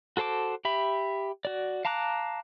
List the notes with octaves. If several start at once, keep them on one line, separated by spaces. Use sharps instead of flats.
F#4 A4 C5 A5 D6
G4 E5 B5
F#4 D5
F5 A5 A#5 D6 F#6